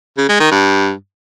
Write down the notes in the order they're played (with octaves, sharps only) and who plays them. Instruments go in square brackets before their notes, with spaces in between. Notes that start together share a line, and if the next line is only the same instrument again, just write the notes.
[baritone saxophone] C#3
G#3
D#3
G2